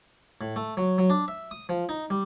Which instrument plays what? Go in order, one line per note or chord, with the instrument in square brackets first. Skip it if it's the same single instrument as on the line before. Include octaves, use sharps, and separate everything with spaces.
[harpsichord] A2
A3
F#3
F#3
D4
E5
D#6
F3
D#4
G3